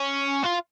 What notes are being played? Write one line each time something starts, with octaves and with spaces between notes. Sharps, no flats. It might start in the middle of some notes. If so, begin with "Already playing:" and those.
Already playing: C#4
F4